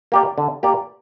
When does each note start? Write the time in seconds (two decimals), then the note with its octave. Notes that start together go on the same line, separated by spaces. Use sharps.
0.12 A#3 G4 D5
0.38 D3
0.63 A#3 G4 D5